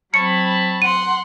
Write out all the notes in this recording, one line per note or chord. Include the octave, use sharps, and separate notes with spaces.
F#3 C4 C#5 A5 B5 C#7
F#5 C6 D#7